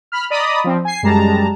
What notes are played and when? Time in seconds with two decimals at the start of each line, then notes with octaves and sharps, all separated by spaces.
0.12 B5 F6
0.30 D5 D#5 A#5 B5 D#6
0.64 F3 C4
0.85 G#5 C7
1.03 F#2 G3 G#3 A5 A#5